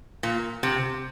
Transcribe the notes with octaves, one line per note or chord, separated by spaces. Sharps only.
A#2
C3